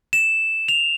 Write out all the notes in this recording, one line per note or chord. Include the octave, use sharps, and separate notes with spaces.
E7
F7